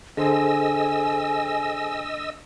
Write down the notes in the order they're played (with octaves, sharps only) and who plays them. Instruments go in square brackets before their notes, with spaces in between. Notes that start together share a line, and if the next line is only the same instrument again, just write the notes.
[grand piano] D3 [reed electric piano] G#4 A4 C5 [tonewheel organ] D#5 E6 [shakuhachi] G#5